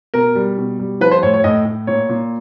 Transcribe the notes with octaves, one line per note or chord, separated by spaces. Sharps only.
B2 A#4
G3
B2
G3
F3 B4
C5
A2 C#5
C#5
A2 D#5
A2
A#2 C#5
A#2